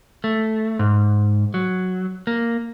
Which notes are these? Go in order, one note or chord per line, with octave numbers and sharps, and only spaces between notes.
A3
G#2
F#3
A#3